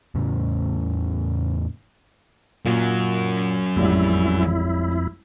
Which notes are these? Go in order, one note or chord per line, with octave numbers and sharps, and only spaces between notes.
E2 A2 C#3
F#2 A#2 F#3
A1 F2 G3 G#3 E4